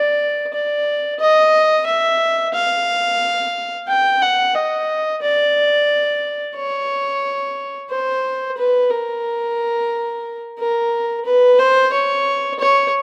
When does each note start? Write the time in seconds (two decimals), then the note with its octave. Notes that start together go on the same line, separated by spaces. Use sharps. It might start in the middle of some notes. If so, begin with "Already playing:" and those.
Already playing: D5
0.53 D5
1.20 D#5
1.87 E5
2.53 F5
3.88 G5
4.21 F#5
4.55 D#5
5.22 D5
6.56 C#5
7.90 C5
8.57 B4
8.90 A#4
10.58 A#4
11.25 B4
11.58 C5
11.93 C#5
12.59 C#5